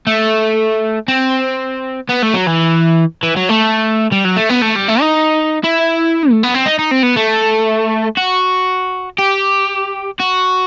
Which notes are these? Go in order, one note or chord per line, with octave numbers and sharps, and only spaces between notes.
A3
C4
B3
A3
F#3
E3
E3
F#3
A3
G3
F#3
A3
B3
A3
G3
A3
D#4
E4
A3
B3
C4
D#4
D#4
C4
B3
A3
F#4
G4
F#4